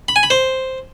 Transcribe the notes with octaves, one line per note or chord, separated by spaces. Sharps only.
B5
G#5
B5
C5